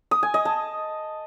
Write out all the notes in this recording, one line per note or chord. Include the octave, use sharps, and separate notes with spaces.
D#6
G#5
D#5
A5